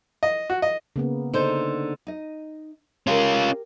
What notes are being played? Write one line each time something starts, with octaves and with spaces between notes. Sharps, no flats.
D#5
F#4
D#5
C#3 A#3 B3
D3 D#4 C5
D#4 D#5
C#4 F4 G4 A#4